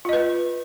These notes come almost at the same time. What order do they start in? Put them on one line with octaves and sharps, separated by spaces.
F4 D#5 B4